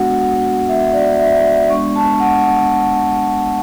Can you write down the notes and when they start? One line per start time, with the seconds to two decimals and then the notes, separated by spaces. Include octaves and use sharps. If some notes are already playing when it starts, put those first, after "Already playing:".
Already playing: G#3 B3 D4 F#4 F#5
0.69 E5
0.93 D5
1.20 E5
1.69 G#3 B3 D4 C#6
1.96 A5
2.20 F#5